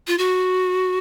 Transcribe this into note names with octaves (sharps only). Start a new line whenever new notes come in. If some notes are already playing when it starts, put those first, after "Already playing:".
F4
F#4